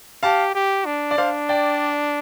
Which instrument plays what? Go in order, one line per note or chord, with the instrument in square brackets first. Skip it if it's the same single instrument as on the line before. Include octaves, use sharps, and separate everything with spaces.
[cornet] G4 [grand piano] F5 A5
[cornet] G4
D4
[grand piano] D5
[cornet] D4 [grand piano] C5 F5
[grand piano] D5 G5